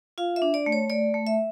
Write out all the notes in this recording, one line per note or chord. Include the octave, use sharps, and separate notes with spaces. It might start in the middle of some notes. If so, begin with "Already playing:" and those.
F4 F5
E5
D4
D5
A3
C#5
A3 D5
A3
E5